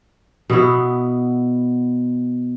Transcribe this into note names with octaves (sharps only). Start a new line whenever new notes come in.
B2 B3 E4